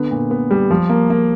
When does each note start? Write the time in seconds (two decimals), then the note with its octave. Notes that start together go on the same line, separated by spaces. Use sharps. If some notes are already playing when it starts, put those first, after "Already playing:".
Already playing: D3 B3
0.11 A#2
0.31 B3
0.51 G3
0.71 F3
0.89 A#3
1.10 A#3